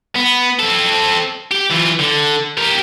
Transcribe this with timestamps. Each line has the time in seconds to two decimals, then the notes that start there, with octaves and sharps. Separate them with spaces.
0.15 B3
0.59 C4 A4
1.51 G4
1.70 E3 F4
1.99 D3
2.58 G4 A#4